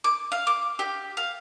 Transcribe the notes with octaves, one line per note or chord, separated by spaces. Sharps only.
D6
F5
D6
G4
F5